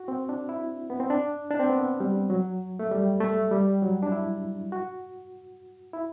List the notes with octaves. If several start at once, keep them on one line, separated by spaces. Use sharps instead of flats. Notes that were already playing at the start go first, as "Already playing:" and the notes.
Already playing: F#4
C4
D4
E4
B3
C4
D4
D4
C4
B3
G3
F#3
A3
G3
A3
G3
F#3
D4
E4
F#4
E4